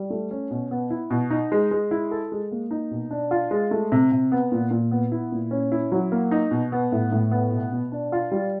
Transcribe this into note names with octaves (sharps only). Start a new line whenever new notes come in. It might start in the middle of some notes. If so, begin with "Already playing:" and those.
Already playing: G3
A3
C#4
B2
B3
E4
B2
D#4
G#3
G#3
E4
A4
G#3
A#3
D#4
B2
D4
F4
G#3
A3
C3
C3
B3
A#2
A#2
B3
E4
A#2
C#4
E4
F#3
A#3
D#4
B2
B3
A2
A2
B3
B2
B2
D4
F4
G3